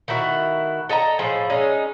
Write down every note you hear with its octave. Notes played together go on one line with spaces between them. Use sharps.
D#3 A3 E4 F#4
A4 D#5 E5 A#5
A2 F3 G#4 A4
G#3 C#4 D#4